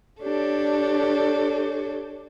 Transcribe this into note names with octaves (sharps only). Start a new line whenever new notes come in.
D4 G4 A4 C#5